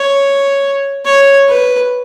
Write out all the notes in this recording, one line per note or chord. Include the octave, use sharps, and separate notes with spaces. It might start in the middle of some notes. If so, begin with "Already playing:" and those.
Already playing: C#5
C#5
B4